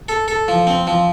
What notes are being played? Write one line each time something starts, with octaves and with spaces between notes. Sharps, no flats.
A4
A4
F3
C4
F3